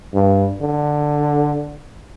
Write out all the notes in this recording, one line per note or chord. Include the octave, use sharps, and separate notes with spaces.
G2
D3